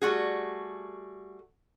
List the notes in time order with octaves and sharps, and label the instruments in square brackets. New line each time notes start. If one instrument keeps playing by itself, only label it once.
[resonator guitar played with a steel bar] G3 A3 F#4 G#4